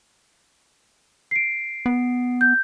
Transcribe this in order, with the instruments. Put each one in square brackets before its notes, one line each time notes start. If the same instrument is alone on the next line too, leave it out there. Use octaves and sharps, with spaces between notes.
[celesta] C7 D7
[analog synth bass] B3
[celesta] G6